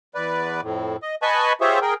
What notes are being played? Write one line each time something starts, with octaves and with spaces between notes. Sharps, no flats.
E2 B4 D5
F2 A2
D#5
B4 D#5 G#5 A5 B5 C#6
F4 G4 G#4 C5 C#5 E5
G#4 A#4 G5